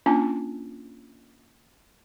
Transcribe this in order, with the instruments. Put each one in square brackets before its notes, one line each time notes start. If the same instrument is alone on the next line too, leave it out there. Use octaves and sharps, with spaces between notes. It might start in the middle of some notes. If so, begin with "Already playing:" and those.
[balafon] A#3 C#4 D4 F4 G#5 A5